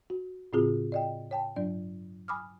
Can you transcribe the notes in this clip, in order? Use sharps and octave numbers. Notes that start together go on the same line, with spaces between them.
F#4
A2 C#3 C4 F4 F#4 G#4
D5 D#5 G5
C#5 G5 A5
G2 F#3 D4 D5
G#5 B5 D6 D#6 F6